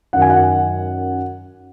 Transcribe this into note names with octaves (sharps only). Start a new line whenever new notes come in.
F#2 D#3 F#5
G#5
F#5